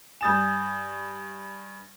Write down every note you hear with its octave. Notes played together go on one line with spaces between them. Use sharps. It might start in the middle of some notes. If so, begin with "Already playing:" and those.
G2 G#5 D#6 G6 A6 E7